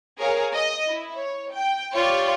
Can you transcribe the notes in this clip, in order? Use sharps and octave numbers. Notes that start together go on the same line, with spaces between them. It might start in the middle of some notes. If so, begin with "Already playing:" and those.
G#4 A#4 C#5 F5
D#5
E4
C#5
G5
F4 G4 C#5 D5